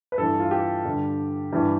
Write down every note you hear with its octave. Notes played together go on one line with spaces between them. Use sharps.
B4
G2 E3 A4
F4
G4
G2 D3
G2 E3